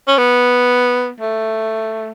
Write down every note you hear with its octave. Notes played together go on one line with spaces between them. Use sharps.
C#4
B3
A3